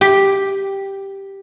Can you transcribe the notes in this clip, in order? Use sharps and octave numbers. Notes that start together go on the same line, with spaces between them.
G4